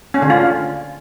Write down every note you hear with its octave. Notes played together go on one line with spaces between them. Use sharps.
C#4
D3
F4